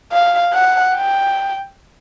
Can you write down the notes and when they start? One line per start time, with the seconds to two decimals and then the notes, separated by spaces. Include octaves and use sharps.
0.12 F5
0.54 F#5
0.95 G5